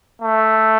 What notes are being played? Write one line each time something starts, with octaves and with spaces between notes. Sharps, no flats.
A3